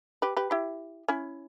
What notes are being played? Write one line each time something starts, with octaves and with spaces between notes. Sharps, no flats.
G4 B4
G4 B4
E4 G4
C#4 E4